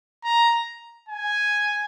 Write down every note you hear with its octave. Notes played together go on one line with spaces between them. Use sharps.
A#5
G#5